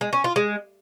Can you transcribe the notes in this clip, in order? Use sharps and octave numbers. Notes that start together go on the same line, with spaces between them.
G#3
C#4
F4
G#3